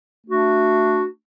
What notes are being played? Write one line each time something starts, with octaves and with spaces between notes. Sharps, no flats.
A3 D4 F#4